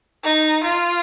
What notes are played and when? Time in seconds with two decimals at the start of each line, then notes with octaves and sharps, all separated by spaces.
0.24 D#4
0.64 F4